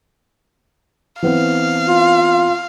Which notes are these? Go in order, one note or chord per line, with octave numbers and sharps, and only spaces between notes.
E3 B3 C4 F5
F4